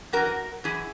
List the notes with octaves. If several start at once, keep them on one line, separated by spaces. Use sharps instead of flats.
F#2 E3 F#4 A#4
F#2 E3 E4 G#4